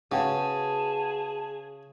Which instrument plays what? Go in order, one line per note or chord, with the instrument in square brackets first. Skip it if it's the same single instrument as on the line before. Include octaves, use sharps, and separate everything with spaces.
[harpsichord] C#3 [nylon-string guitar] B3 F#4 G5 [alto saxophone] G#4 [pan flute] A5